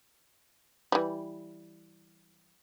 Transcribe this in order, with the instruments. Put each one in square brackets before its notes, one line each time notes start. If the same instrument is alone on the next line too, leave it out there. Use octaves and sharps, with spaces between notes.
[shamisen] E3 G3